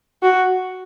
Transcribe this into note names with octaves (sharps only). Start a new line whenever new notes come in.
F#4